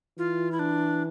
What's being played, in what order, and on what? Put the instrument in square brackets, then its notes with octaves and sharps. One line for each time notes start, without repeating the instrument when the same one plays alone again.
[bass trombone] E3 [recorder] F4
[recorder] E4
D4